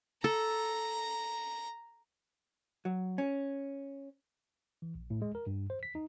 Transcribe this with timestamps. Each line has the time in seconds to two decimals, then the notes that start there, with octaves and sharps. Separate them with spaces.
0.24 A4 A#5
2.85 F#3
3.18 C#4
4.82 E3
4.95 A#1
5.10 A2
5.22 G#3
5.35 A#4
5.47 G2
5.70 C5
5.83 B6
5.95 D#4